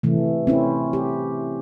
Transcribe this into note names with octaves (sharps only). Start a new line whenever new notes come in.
C3 E3 A3
C4 C#4 E4
G4